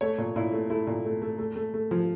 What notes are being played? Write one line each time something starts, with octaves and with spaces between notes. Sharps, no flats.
A3 C#5
A#2
A#2 E4
A3
A3 E4
A#2
A3
A3
A3
A3
A3
F3